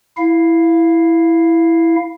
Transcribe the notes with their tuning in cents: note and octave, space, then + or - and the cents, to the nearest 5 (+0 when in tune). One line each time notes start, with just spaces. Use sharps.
E4 +0 F5 +0